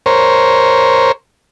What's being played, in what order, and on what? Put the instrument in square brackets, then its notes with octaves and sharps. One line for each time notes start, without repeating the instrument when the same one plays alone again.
[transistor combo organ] A#4 C5 C#5